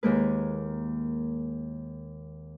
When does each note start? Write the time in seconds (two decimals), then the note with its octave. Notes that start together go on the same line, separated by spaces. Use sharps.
0.03 D#2 G#3 A#3 B4